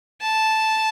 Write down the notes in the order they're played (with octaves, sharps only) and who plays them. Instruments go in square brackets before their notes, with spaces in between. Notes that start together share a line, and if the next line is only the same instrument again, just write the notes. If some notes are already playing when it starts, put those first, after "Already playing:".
[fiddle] A5